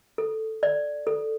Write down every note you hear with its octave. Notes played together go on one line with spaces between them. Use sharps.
A4
D5
A4